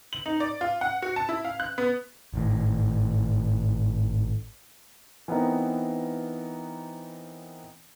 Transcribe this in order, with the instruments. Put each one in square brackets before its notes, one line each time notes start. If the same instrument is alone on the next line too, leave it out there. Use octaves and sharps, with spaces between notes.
[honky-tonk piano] F#7
D#4
D5
F4
F#5
F#4
A5
E4
F5
F#6
B3
[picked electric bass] G#1 A2
[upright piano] E3 B3 C4 D#4 A#4